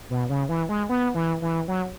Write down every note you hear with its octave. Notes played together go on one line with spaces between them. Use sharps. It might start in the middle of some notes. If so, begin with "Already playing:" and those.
B2
C#3
E3
G#3
B3
E3
E3
F#3